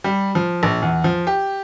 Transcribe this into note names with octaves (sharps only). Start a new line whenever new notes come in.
G3
F3
A#1
E2
F3
G4